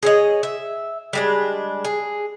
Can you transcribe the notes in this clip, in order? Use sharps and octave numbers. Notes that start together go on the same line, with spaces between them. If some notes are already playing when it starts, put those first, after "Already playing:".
G#4 C#5 D#5
E5
G3 G#3 D4
G#4